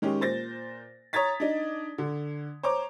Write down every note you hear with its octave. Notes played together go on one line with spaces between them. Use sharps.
D#3 G#3 C#4 G4
A#2 C5 A6 A#6
C#5 A#5 D#6 G#6 A6 B6
D4 D#4
D3
C5 C#5 A#5 D6